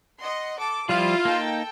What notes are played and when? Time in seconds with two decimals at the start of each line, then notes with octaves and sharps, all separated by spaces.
0.19 D#5 F#5 C6
0.59 A4 D6
0.89 F3 G3 E4 F4
1.25 A#3 D#4 A4 G5